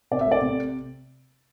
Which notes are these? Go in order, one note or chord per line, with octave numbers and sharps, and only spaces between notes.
C3 D5
E5
A3
D5
C3